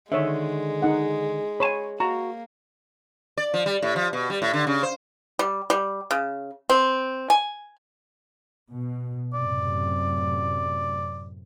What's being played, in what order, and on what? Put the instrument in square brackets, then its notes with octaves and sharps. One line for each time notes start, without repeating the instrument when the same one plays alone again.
[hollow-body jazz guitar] D3 D#3 [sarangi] G#3 [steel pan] C#5 E5
[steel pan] D#4 F#5
[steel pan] C#5 C6 [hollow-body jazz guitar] G#5 A5 B5
[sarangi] A#3 [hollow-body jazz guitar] F#4 [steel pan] A#5
[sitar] D5
F3
G3
A2
F3
B2
G3
A2
D3
C#3
C5
[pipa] G3
G3
C#3
C4
G#5
[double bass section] B2
[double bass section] F#2 A2 C3 [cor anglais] D5